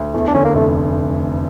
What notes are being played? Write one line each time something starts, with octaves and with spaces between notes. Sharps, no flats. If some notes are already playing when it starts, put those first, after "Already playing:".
Already playing: D2
E2 A3
D4
D3 C#4
A#3
F1 A3